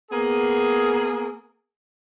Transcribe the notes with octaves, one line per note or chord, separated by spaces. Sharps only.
A#3 B3 G#4